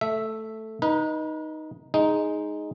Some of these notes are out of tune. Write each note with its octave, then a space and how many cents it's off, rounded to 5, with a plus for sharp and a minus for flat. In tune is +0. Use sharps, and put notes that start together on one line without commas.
A3 +0 E5 +0
D#4 +0 B4 -35
G#3 +0 D#4 +0